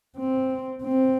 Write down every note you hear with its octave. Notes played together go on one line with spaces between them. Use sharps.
C4
C4